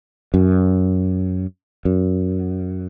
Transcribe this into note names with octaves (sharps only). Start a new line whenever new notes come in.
F#2
F#2